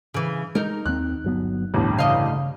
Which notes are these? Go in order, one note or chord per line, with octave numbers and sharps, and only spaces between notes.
C#3 E3
G#3 D#4 A#4
D#2 C4 F#6
G1 F#3 B3
E1 A1 D2 G2 B3
D2 C#3 D#5 F5